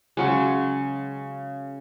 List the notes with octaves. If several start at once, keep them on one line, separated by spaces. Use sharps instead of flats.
C#3 F#3 G#3